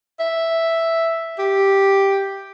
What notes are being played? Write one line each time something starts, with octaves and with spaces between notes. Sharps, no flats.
E5
G4